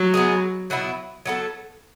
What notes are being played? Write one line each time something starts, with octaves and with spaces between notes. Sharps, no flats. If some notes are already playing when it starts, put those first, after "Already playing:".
Already playing: F#3
G#3 B3 D4 G#4
B2 F#3 B3 E4
F#3 B3 E4 A4